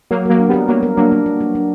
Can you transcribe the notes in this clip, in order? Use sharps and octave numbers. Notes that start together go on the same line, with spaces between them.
F#3 A#3 F#4
F#3 A#3 A#4
D4
G3 B3 A#4
F#3 A#3 A#4
A#4
F#3 A#3 D4
D4
F#4
F#4
D4